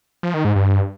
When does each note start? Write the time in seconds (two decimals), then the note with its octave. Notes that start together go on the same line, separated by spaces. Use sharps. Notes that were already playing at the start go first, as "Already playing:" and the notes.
0.23 F3
0.34 D#3
0.45 G#2
0.56 G2